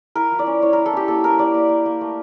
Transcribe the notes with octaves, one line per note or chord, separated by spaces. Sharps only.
E4 A#4
F3
D5
C#4
E4 C#5
E4 A#4
A4
C#4 G4
A#3 A4
E4 A#4
A#3 D5
A#3
A#3
A#3
A3